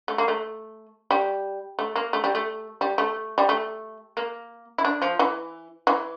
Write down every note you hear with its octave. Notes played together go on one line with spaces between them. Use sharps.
A3
A#3
A3
G3
A3
A#3
A3
G3
A3
G3
A3
G3
A3
A#3
E4
D4
F3
E3
E3